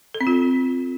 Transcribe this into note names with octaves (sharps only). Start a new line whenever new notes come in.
A4
C4
F4